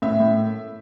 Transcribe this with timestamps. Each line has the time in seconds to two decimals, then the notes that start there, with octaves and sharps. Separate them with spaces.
0.02 A2 E5
0.20 A2